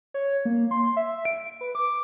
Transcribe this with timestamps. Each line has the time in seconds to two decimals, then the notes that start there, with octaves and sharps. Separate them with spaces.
0.14 C#5
0.45 A#3
0.71 C6
0.97 E5
1.25 D7
1.61 B4
1.75 D6